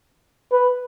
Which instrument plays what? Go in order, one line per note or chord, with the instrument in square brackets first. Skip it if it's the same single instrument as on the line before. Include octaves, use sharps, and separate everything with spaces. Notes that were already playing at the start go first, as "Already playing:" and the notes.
[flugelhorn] B4